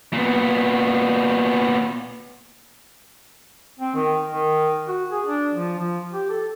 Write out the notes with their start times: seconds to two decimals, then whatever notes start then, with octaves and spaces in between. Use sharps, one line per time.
0.13 A#2 B3
3.79 C4
3.95 D#3
4.27 D#3
4.88 F#4
5.11 G#4
5.26 D4
5.53 F3
5.79 F3
6.13 G4
6.30 A4